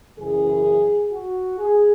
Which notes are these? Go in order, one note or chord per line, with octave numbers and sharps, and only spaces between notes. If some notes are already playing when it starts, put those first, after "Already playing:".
F#1 F#2 E3 G#4
F#4
G#4